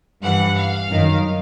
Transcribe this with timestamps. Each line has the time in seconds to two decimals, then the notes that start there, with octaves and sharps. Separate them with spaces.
0.22 G2 E3 F#5
0.56 F5
0.89 F#2 D#3